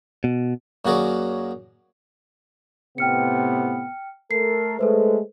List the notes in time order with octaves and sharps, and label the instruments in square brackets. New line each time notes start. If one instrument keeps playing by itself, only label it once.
[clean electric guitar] B2
[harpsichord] F#2 A#3 F#4 G#4 A#4 D5
[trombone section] A2 C3 B3 [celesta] G5 F6 C#7
[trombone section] A3 A4 A#4 [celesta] C7
[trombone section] G#3 A3 [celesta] A4 B4 C5